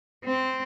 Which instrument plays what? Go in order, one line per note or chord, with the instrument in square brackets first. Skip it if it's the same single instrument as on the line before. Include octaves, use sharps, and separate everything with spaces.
[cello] C4